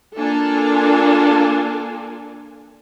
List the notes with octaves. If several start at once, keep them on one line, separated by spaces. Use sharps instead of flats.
A#3 D4 F4 A4 G#5